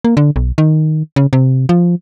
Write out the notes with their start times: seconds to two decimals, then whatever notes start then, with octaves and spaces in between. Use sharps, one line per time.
0.04 A#3
0.17 D3
0.36 B1
0.58 D#3
1.16 C#3
1.33 C3
1.69 F3